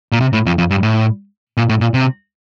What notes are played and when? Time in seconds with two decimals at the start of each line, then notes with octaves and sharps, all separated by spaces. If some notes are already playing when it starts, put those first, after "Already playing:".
0.12 A#2
0.21 C3
0.33 A2
0.46 F2
0.58 F2
0.71 G2
0.83 A2
1.57 A#2
1.69 A2
1.81 A#2
1.94 C3